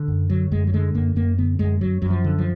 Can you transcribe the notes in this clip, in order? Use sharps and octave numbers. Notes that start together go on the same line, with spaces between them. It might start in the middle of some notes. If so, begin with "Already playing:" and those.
Already playing: D3
F#2
D3 F#3
F#2 G#3
F#3
D3 G#3
F#2 A#3
F#2 A#3
D3 B3
F#2 G#3
F#2 F#3
F#2 F#3
F3
D3
F3